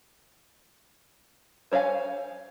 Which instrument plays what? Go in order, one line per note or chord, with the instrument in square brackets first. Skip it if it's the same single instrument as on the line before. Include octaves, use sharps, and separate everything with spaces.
[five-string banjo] C5 C#5 D#5 F5 G#5